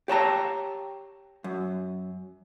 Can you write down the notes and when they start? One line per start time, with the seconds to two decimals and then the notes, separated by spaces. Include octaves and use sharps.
0.08 G4 C#5 A5 A#5
1.44 F#2